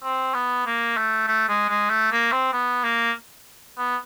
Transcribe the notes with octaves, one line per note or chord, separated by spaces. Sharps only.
C4
B3
A#3
A3
A3
G#3
G#3
A3
A#3
C4
B3
A#3
B3